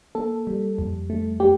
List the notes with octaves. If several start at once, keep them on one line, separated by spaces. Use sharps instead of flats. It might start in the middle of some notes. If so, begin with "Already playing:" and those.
A#3 A4
G3
F2
A3
A3 G4